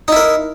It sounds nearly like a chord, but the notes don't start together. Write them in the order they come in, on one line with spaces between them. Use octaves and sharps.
D#4 E4 A#4